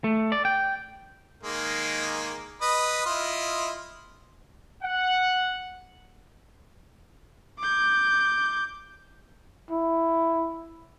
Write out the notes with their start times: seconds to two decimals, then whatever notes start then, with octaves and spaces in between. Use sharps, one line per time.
0.04 A3
0.32 D5
0.45 G5
1.43 D#3 G#3 A#3
2.62 B4 D#5
3.06 E4 F4 D#5
4.83 F#5
7.60 D6 G6
9.71 E4